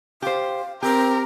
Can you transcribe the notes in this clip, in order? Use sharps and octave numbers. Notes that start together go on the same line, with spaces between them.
G4 C5 F5
C4 G4 A#4